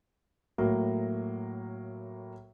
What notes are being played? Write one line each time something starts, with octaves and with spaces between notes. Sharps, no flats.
A2 F#3 A#3